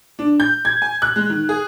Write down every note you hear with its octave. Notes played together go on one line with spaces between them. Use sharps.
D4
G6
G#6
G#5
F#6
G#3
D#3
G#4